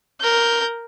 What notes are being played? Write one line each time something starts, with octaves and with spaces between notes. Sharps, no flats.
A#4 G6